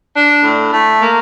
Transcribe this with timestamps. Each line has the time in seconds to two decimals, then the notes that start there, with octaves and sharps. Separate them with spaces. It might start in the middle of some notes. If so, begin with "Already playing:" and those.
0.14 D4
0.43 A2
0.72 A3
1.01 A#3